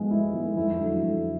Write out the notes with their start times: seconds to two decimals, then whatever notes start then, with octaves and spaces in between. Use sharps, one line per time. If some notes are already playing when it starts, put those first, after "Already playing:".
Already playing: G#2 F3 G#3 B3 F4
0.11 G#2 E4
0.34 F3 G#3 B3
0.56 F2 E4
0.80 D3 F#3 A3
1.03 F2